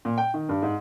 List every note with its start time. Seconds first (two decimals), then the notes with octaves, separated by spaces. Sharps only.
0.05 A#2
0.18 G5
0.34 D#3
0.49 G2
0.62 G#2